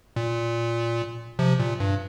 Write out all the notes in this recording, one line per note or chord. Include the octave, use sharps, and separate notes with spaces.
A#2
C3 F3
A#2
G2